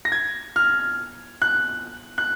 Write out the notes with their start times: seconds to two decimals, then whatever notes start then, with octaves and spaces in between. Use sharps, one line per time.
0.05 A#6
0.12 G#6
0.56 F6
1.42 F#6
2.18 F#6